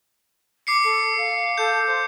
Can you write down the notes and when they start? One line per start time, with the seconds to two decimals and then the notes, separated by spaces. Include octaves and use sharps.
0.67 D6 C7 C#7
0.84 A4
1.18 F5
1.58 A4 G6
1.87 C5